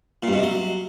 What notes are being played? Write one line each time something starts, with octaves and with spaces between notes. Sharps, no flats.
A#2
G2
B2
C3
F#3